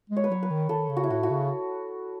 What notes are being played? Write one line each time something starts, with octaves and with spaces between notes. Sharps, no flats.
G#3
C#5
B4
F#3 C#5
B4
D#3
D#3 A4
C#3
F#4
E4
A2 F#4
F#4
C#3